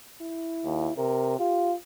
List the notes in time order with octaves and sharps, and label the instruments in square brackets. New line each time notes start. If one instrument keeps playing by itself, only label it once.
[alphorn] E4
[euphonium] D#2
[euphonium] C3 [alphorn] A#4
[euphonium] F4 [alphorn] G4